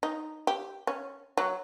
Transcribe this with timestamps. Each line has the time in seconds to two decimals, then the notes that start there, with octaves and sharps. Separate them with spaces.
0.03 D#4
0.47 G4
0.87 C#4
1.37 F#3